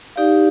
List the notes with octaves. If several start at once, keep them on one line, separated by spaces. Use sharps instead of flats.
D#4 G4 D5 F5